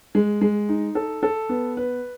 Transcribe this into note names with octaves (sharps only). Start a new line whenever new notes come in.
G#3
G#3
D#4
A4
A4
B3
B4